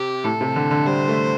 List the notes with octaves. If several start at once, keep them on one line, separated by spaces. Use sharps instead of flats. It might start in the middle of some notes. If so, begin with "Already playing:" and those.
Already playing: C3 G4
A2 A4
C3
D3
D3
G3 C5
A3